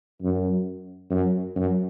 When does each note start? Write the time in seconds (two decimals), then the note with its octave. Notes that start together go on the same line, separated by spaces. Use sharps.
0.22 F#2
1.11 F#2
1.56 F#2